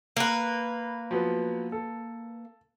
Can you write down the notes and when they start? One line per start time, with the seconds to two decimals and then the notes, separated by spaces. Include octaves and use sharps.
0.17 A#3 B4
1.11 F3 F#3 B3
1.72 A4